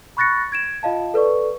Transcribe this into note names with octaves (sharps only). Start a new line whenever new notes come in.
B5 C#6 F#6 A6 A#6 C#7
G#6 D7 E7
F4 D#5 F5 A5
A4 B4 D5 C#6